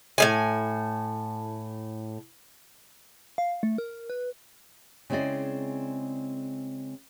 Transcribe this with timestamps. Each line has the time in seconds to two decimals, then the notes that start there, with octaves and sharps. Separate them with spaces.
0.18 A2 C#3 G#5
3.38 F5
3.63 A3
3.78 A#4
4.10 B4
5.10 C#3 G#3 C4 E4 D5 D#5